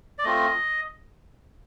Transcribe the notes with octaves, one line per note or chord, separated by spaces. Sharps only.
D5
A3 C4 F4 D#5